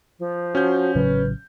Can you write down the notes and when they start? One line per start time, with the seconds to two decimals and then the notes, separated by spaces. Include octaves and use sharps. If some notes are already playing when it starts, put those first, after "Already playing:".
0.19 F3
0.55 C#4 F#4 G6
0.95 A1 C#3 F#3 B4